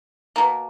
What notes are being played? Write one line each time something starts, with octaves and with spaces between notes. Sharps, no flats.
B2 A#3